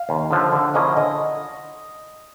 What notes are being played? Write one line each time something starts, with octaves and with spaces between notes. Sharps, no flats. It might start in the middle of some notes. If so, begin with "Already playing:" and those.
Already playing: F5
D#2
D3 F3
D3
F3 A#3 C#4 E4 D#5
D3 D#5